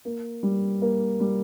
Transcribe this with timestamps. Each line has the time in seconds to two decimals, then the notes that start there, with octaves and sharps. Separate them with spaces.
0.05 A#3
0.43 G3
0.82 A#3
1.20 G3